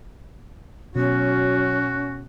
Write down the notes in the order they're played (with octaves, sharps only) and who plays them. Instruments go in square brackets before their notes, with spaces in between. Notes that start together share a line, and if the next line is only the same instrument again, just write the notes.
[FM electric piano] B2 [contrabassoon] F#3 [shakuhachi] C#4 [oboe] F#4